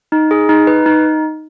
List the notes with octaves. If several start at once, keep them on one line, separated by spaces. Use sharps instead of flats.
D#4
G#4
D#4
B4
D#4